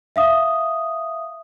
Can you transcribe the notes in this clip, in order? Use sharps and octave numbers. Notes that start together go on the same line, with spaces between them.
E5 F5 D#6